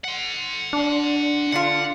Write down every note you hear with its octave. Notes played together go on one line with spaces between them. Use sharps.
F#5 C6
D4
D3 D4 F4 F#5